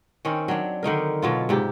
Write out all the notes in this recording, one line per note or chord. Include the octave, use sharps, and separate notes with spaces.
D#3 C4 C#4
F#3 D4
D3 D#3 D#4 A#4
B2 F#3 F4
G#2 C3 G4